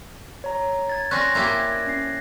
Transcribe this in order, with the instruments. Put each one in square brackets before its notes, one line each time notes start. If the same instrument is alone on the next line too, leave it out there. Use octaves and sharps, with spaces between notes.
[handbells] C#5 A#5
[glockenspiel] G#6 A6
[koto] C4 C#4 [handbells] D5 [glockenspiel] F#6 A#6
[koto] A#3 E4 G4
[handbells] C#4 C7